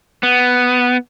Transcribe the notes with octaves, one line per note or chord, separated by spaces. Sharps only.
B3